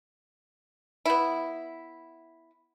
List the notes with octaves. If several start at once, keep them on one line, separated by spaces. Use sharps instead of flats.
B3 E4